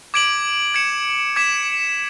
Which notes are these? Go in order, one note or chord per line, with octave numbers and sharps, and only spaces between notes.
D6 G#6 D7 F#7
G#6 C#7 E7
D6 G#6 B6 E7